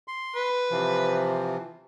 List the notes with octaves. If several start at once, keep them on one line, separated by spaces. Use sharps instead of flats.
C6
B4
C3 E3 F3